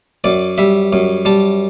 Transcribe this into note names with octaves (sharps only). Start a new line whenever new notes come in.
F#2 D5
G3 E5
F#2
G3 A5